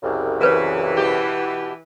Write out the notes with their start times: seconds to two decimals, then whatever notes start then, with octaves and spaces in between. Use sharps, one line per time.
0.03 C2 F#2 C#3
0.41 E3 A#4 B4 C#5
0.97 B2 G4